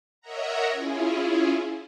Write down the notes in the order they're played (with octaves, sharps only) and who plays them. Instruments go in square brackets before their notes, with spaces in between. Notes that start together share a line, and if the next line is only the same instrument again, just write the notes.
[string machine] A#4 C#5 D#5 E5 F#5 A#5
C#4 E4 F4 G#4